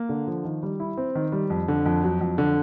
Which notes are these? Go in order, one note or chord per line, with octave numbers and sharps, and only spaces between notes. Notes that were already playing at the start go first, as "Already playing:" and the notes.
Already playing: A#3
D3
F3
D#3
G3
E4
C4
D#3
G3
F2
D3
F2
F#3
F2
D3